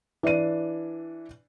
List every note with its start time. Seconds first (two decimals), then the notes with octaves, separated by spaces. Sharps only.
0.23 E3 D4 D5 D#7